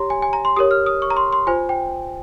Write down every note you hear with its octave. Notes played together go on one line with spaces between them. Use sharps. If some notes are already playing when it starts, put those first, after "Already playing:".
Already playing: G4 C#5 A#5 C6
G#5
G#5
A#5
C6
G4 A#4 C#5 D#6
F6
D#6
C#6
A#5
C6
C6
F4 C5 G#5
G5